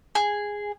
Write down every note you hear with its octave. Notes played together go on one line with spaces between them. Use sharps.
G#4